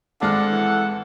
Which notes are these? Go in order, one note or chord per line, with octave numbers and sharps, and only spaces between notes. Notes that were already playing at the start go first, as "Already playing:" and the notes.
G#1 G#3 D4 A4 F#5 F6
E3